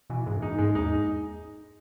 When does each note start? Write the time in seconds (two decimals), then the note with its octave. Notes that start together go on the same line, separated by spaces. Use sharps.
0.10 B2 E3
0.26 G#2 G#3
0.36 F#2
0.42 G#2 D#4
0.58 G#2 G#3
0.75 E2 D#4